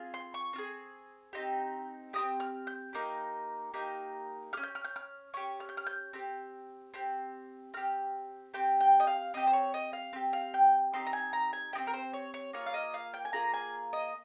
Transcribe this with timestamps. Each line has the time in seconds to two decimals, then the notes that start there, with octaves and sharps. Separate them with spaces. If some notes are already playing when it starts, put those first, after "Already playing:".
Already playing: C4 F4 G#4
0.14 C6
0.34 C#6
0.53 C4 F4
0.58 G#4
1.33 C4 D#4 G4
2.13 D#4 G4 D#6
2.18 C4
2.40 F6
2.67 G6
2.93 A#3 D#4 G4
3.74 A#3 D#4 G4
4.53 G4 F6
4.57 C#4
4.63 G6
4.75 F6
4.85 G6
4.96 F6
5.34 C#4 G4 C#6
5.60 F6
5.69 G6
5.77 F6
5.87 G6
6.13 C4 G4
6.94 C4 G4
7.74 C4 G4 F6
8.54 C4 G4 G5
8.81 G5
9.00 D#5
9.07 F5
9.34 C4 G4 D#5
9.47 C5
9.53 C#5
9.74 D#5
9.93 F5
10.13 C4 G4
10.33 F5
10.54 G5
10.94 C4 D#4 G4 C6
11.07 A#5
11.13 G#5
11.33 A#5
11.53 G#5
11.73 D#4 G4 G5
11.78 C4
11.87 A#4
11.93 C5
12.13 C#5
12.34 C#5
12.53 A#3 F4 G#4 C#5
12.66 F5
12.74 D#5
12.94 F5
13.14 G5
13.25 G#5
13.33 A#3 F4 G#4 A#5
13.54 G#5
13.93 D#5